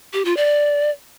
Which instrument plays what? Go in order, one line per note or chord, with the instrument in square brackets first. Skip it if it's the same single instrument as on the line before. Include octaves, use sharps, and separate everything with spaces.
[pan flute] G4
F4
D5